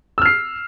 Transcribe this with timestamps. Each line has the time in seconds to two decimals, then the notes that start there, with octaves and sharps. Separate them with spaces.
0.18 E6
0.22 F6
0.25 C7